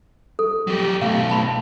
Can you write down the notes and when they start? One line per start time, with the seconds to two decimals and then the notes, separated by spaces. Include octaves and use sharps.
0.39 A4
0.67 F#3 G4
1.01 B1 A3 F5
1.30 A5 B5 C6